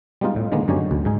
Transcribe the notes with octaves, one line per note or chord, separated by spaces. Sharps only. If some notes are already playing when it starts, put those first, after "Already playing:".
G3 G#3 B3 D#4 F4
A2
D3 D#3 G#3 A#3 B3
F#2 D3 D#4 G4 C#5 G#5
D2
G#2 G#3 D#4 G#5